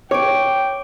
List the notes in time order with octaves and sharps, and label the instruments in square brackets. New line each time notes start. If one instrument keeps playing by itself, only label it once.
[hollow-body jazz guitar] C#5 [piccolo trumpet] G5 [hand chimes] D6 D7